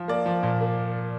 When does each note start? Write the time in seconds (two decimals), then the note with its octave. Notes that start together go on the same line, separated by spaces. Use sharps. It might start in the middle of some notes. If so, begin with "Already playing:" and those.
Already playing: F3
0.08 A#3 D5
0.26 F3
0.43 A#2
0.61 A#3